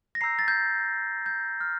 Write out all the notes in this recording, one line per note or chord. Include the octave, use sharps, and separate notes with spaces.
A#6
A#5 E6 G6 C7
A6
G6
G6
F6